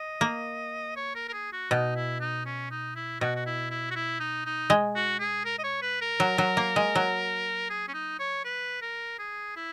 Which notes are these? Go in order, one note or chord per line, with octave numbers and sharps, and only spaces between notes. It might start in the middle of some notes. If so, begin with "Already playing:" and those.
Already playing: D#5
A#3
C#5
A#4
A#4
G#4
F#4
B2 D#4
E4
D#4
C#4
D#4
E4
B2 F#4
F#4
E4
E4
F#4
E4
D#4
D#4
G#3
F#4
G#4
A#4
D#5
C#5
B4
A#4
F#3
F#3
A#3
G#3
F#3
G#4
C#4
D#4
C#5
B4
A#4
G#4
E4